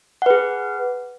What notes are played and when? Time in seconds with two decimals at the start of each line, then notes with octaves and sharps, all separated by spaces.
0.22 F#5
0.26 B4
0.30 G#4